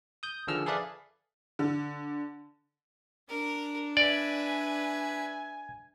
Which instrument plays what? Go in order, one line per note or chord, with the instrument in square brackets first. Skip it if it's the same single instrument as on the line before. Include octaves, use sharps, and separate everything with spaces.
[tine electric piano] D#6 G6
D3 D#3 F3 G#4 E6 F6
G#4 A4 B4 D5 E5 F5
[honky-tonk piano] D3
[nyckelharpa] D4 [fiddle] A#4
[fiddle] B4 E5 [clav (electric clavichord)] D5 [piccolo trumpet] G#5